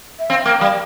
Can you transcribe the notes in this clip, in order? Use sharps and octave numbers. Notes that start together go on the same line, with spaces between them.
E5
C4 F5
A#3 G5
G3 F5